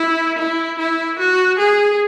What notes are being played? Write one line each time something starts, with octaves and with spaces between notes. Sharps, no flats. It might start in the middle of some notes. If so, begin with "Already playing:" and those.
Already playing: E4
E4
E4
F#4
G#4